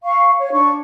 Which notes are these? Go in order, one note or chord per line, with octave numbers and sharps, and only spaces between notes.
F5 C#6
C#5
D4 C#6